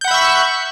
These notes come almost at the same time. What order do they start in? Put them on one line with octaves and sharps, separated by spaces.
G6 F#5 B5 E5 C#6